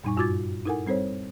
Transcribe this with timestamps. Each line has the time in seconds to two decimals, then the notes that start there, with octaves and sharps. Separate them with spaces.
0.04 F#2 A#2 G3 D#4 G#5 C#6
0.17 G2 F4 F#4 D6 G#6 A6
0.65 D#4 E4 A4 A#4 F#5 G#5
0.86 G3 C4 A4 C5 C#5